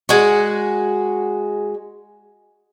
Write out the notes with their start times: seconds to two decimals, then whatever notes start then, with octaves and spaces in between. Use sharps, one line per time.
0.09 G#3 F#4